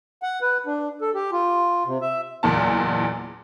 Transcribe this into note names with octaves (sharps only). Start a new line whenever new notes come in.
F#5
B4
D4
A4
G4
F4
C3
E5
F#1 E2 A#2 A5